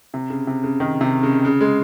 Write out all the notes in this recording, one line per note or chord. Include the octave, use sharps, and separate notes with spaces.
C3
C#3
C3
C#3
D#3
C3
C#3
C#3
G#3